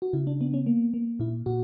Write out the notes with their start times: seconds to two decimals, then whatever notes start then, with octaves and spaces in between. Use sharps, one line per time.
0.02 F#4
0.13 C#3 E4
0.27 D4
0.41 B3 D4
0.54 C#4
0.66 A#3
0.94 A#3
1.20 A#2 E4
1.46 A#2 F#4